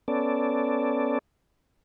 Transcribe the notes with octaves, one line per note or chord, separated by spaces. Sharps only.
B3 C#4 A4 D5